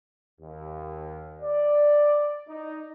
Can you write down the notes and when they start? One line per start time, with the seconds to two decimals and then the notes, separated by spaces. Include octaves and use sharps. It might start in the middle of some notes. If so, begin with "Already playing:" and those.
0.41 D#2
1.42 D5
2.49 D#4